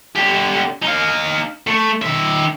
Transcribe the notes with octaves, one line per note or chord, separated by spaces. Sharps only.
D3 G4
D#4 F5
A3
D#3 E5